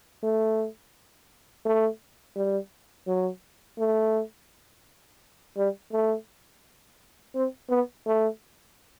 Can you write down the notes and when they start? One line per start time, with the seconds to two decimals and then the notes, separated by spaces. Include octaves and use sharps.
0.23 A3
1.65 A3
2.36 G3
3.07 F#3
3.79 A3
5.57 G3
5.92 A3
7.35 C4
7.70 B3
8.06 A3